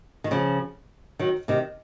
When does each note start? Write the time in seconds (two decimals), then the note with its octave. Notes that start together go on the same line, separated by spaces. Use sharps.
0.24 D#3
0.31 C#3 F3
1.19 D#3 F#3
1.48 C3 D#3